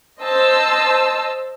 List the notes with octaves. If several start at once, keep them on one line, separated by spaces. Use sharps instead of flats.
C5 D#5 A5 E6